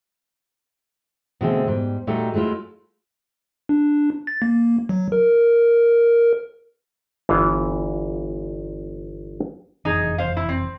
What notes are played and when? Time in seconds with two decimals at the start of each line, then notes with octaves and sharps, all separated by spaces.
1.41 B2 D3 A3 C4 G#4 A4
1.67 G#2 G3
2.07 A#2 G3 A3 D#4 F#4 G4
2.34 F#3 G#3 A3 E4 F4
3.69 D4
4.27 A6
4.42 A#3
4.89 F#3
5.12 A#4
7.29 G1 E3 B3 F4 F5
9.85 F1 F#2 E3 D#4 G#4
10.18 C5 F5
10.37 E4
10.49 C4